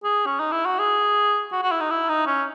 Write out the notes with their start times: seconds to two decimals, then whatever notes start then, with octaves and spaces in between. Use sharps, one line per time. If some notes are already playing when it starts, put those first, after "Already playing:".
0.04 G#4
0.26 C#4
0.40 D#4
0.52 E4
0.66 F#4
0.79 G#4
1.52 F#4
1.62 F#4
1.72 E4
1.80 D#4
1.90 E4
2.09 D#4
2.27 C#4